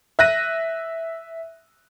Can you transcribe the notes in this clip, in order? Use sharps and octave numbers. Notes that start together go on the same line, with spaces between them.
E5 F#6 A#6 D#7